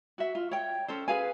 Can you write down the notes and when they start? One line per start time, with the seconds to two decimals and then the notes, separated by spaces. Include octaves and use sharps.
0.18 F#4 E5
0.35 F4
0.51 C#5 G5
0.88 C#4 A4 C5
1.08 G#4 B4 F5 G#5